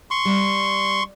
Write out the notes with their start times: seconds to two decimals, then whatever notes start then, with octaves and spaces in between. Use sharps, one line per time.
0.11 C6 C#6
0.25 G3